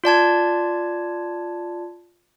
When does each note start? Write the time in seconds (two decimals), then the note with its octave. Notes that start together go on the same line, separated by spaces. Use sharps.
0.04 F4 D5 A5 G#6